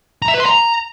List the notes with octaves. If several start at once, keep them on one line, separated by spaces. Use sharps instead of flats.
A#5
E5
B4
C6
A#5